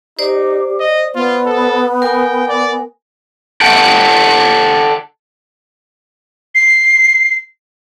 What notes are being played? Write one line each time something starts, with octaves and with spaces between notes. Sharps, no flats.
D#4 G4 C5 D5
D#5
B3 F4
A4
A#4 G5 G#5
D5
A4 F#5 G5
C7